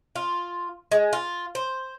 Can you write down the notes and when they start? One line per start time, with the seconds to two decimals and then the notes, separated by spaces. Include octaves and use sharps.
0.16 F4
0.92 G#3
1.13 F4
1.55 C5